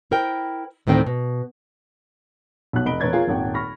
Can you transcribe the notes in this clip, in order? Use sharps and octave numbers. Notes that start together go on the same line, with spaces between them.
E4 A#4 C5 G5
D2 A2 D#3 C4 G5
B2
B1 B2 F#6
F1 D#5 B5 D7 G7
E1 B4 C#5 G#6 A6
F4 G#4 A#4 C#5
D#1 G#1 F#5 G5
B5 C#6 F6 A#6